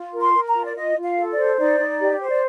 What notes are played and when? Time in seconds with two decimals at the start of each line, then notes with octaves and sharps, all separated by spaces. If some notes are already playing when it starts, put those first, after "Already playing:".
Already playing: F4
0.13 A#4
0.20 C6
0.34 A#4
0.48 A#5
0.55 F4
0.64 D5
0.76 F4 D#5
0.96 F4
1.03 F5
1.17 A4
1.31 D5
1.37 C5
1.59 D#4 D5
1.79 D#4
2.00 G4
2.21 C5
2.29 D5